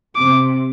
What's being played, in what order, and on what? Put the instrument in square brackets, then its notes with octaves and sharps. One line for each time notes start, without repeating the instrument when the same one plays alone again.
[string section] C3 [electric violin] D6